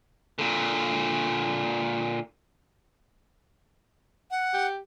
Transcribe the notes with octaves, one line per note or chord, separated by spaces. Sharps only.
A#2 D3
F#5
G4